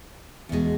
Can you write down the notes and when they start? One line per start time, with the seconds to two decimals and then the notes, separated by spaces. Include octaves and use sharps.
0.49 E2 B2 G#3